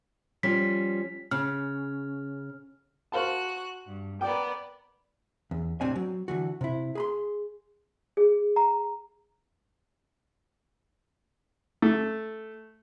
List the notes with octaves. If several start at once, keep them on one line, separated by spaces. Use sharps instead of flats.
F3 G3 C#4 B6
C#3 F6
F#4 C5 F5 A5 F#6
G2
B3 A#4 D5 G5 D6
E2
A2 C3 C4 D4 G#5
F#3
D3 E3 F#4
C3 E4
G#4 B5 C6
G#4
A#5
A3